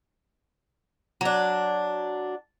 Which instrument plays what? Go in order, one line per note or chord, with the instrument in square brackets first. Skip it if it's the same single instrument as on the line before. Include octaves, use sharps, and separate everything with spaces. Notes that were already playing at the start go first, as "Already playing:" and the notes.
[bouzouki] F#3 D4